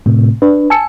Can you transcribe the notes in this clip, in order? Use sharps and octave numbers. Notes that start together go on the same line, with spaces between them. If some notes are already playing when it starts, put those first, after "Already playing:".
A2 C3
D4 B4
G#5 A5 E6 C#7